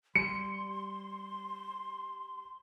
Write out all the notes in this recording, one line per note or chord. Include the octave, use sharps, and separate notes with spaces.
G3 C6 C#7